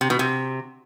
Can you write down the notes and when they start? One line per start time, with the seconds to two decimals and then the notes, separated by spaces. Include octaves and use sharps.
0.01 C3
0.10 B2
0.19 C3